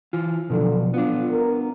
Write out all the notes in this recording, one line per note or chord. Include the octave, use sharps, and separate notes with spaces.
E3 F4
B2 D3 F3 F#3
B3 D4 F4
A#4